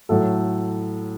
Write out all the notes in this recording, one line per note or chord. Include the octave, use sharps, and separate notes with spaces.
A2 F#3 A4